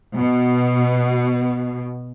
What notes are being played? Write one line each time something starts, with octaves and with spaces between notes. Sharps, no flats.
B2